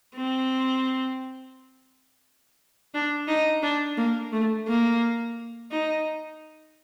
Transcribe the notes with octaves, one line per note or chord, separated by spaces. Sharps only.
C4
D4
D#4
D4
A#3
A3
A#3
D#4